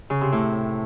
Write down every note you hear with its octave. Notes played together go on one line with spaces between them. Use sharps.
C#3
C3
A2